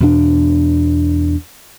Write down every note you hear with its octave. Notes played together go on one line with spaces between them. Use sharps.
E2 B2 B3 D4